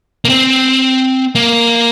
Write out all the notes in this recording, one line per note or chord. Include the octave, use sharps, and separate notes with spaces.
A#3
C4
A#3